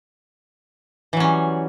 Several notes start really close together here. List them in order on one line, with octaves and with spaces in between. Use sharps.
E3 F#3 C#4 G3